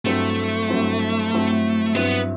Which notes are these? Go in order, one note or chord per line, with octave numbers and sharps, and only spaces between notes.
G2 F#3 A3 C4 E4
G2 F#3 C4 E4
G2 F#3 C4 E4
G2 F#3 B3 C4 E4